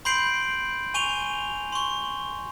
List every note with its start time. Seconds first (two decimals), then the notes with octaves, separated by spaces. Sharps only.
0.05 B5 C6 G6 C7 D7 F#7
0.94 G#5 C#6 D#7 F7 G7
1.72 C6 C#6